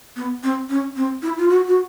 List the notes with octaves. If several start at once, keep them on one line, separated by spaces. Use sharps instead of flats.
B3
C4
C#4
C4
E4
F4
F#4
F#4